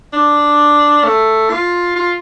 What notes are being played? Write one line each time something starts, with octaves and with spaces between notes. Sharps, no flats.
D4
A3
F4
F4